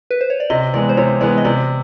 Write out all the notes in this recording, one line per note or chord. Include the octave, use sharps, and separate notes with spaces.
B4
C5
C#5
D5
C3 D#5
E3 G#3 B3 D5
C5
C3 C#5
E3 G#3 B3 D5
D#5
C3 D5